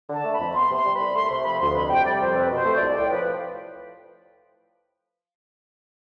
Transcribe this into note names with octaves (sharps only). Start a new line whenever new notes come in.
D3 A5
A3
B5
F2
B3 C6
C3
C6
G3
C2 B5
A3 C6
C3 C6
F3 B5
D2 C6
F2 B5
C3 G5
G3 D5
F2 C5
C4 B4
B2 C5
A3
D5
C2
A2 G5
F3 B4